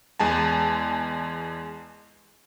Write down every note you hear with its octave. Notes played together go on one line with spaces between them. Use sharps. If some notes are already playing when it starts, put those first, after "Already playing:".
E2 G#3 G#5 A5